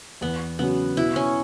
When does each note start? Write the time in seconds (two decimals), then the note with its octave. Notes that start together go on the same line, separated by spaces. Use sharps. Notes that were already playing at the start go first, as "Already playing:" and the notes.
0.21 E2 B3
0.59 C#3 F#3 B3 C#4 F#4
0.97 B2 E4
1.16 C#4